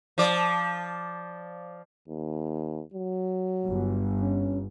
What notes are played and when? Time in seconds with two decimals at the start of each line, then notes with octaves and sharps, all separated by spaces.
0.18 F3 D5
2.08 D#2
2.94 F#3
3.68 G1
4.21 C#4